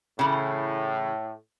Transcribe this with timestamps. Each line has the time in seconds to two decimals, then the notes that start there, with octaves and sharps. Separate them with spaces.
0.19 A2 C#3 E3